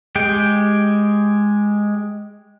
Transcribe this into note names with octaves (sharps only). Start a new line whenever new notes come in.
G#3 G4 G5